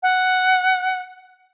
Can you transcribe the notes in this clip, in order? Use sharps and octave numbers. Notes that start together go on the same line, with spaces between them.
F#5